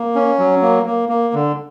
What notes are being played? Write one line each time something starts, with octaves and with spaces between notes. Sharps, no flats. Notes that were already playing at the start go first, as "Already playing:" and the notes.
Already playing: A#3
C#4
F#3
A#3
A#3
A#3
D3